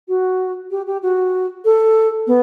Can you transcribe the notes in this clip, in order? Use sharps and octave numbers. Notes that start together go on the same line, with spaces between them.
F#4
G4
G4
F#4
A4
B3